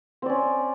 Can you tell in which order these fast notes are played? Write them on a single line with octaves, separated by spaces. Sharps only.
C4 D5 C#4